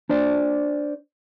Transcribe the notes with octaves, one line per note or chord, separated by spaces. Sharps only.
D4 C5 D5